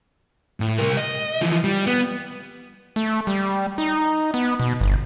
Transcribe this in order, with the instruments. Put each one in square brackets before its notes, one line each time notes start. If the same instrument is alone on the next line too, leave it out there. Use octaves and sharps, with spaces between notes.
[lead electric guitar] A2
C2 A#4
D#5
E3 F3
G3
B3
[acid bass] A3
G3
D#4
B3
B2
G1